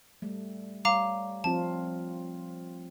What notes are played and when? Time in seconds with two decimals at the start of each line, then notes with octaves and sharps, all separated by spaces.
0.22 G3 A3
0.85 G3 C#5 F5 A#5 D6
1.44 F3 C4 F4 A5